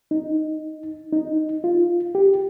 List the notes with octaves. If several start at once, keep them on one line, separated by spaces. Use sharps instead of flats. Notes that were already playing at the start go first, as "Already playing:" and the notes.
D#4
D#4
F4
G4